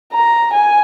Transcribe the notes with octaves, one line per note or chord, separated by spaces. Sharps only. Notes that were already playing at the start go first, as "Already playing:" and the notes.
A#5
G#5